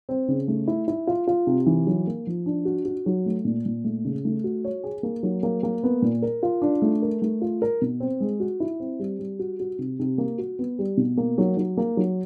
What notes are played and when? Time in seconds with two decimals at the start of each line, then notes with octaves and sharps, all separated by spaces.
0.09 C4
0.28 C#3
0.48 A3
0.68 E4
0.88 E4
1.07 F4
1.27 F4
1.47 C3
1.66 E3
1.87 F#3
2.07 A#3
2.27 F3
2.46 D4
2.65 F#4
2.85 F#4
3.06 F#3
3.26 A3
3.45 A#2
3.66 A#2
3.84 A3
4.05 C#3
4.25 A3
4.44 F#4
4.64 C#5
4.84 G#4
5.03 A#3
5.23 F#3
5.43 A#3
5.63 A#3
5.83 B3
6.02 A#2
6.22 A#4
6.43 F4
6.62 D4
6.82 A3
7.02 A#4
7.22 A3
7.42 F4
7.62 A#4
7.81 B2
8.00 C4
8.20 G#3
8.40 F#4
8.60 E4
8.80 C4
8.99 G3
9.19 G3
9.39 F#4
9.60 F#4
9.79 C3
9.99 C3
10.18 A#3
10.38 F#4
10.59 B3
10.79 G3
10.97 B2
11.17 A#3
11.38 F#3
11.57 F#3
11.77 A#3
11.97 F#3